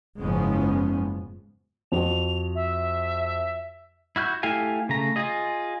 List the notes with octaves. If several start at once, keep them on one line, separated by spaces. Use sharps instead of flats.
F#1 G#2 F3 G#3 B3 C#4
F2 F#4 F7
E5
E4 F#4 F6 G6
A3 E4 G4 F5 G#5
C#3 A3 A#5
F4 G#4 D#5